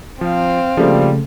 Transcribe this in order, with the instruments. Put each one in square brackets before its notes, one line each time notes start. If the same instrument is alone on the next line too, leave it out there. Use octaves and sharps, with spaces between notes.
[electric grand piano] F3 [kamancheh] C4 F5
[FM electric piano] C#3 A3 [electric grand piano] F3 A#3 [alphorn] G3